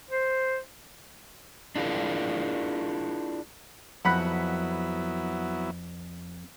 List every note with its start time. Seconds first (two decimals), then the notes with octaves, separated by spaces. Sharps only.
0.11 C5
1.76 D4 E4 F4 G#4 A#4
4.05 F2 F#3 B3 E4 F#5 B5 F#6